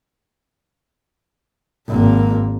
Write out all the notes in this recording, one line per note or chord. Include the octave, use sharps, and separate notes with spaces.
G#1 A#3